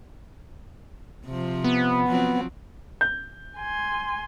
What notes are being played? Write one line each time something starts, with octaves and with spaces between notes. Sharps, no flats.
C3 F3
B3
F3 F#3 C4
G6
G#5 C6